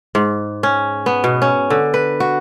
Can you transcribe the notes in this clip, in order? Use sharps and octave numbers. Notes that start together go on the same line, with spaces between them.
G#2
C#4
B3
B2
C#4
D3
B4
F#4